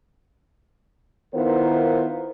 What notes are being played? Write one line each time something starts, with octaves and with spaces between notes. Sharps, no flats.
D#3 B3 E4 F4 A#4 C5